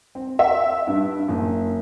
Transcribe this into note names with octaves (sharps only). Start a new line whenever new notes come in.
C4
E5
G2
F#1